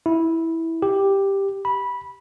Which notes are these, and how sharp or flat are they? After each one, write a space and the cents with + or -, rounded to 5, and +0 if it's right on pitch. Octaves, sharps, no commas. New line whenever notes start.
E4 -10
G4 +5
B5 -15